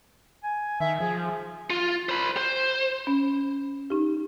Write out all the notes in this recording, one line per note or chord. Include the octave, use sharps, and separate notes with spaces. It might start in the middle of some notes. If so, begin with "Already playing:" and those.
G#5
D#3 E5
F3 G#4
G#4
F4
C5 B5
C5
C#4
D#4 G4